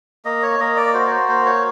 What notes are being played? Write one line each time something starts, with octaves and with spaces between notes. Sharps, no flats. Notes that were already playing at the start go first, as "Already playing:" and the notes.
A#3 D#5
C#5
A#3 D#5
D5
F#4 C5
C#5
C5
A#3 C5
C#5